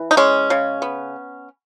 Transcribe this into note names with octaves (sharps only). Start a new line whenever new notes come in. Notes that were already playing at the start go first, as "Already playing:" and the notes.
Already playing: E3
D#4
G#3 C#4
C#3
B3